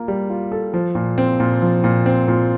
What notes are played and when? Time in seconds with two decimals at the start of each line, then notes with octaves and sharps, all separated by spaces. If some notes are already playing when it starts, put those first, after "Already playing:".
Already playing: A#3 F4
0.08 G3
0.30 F4
0.52 A4
0.74 F3
0.95 A#2
1.18 C4
1.40 A#2
1.62 F3
1.84 A#2
2.06 C4
2.28 A#2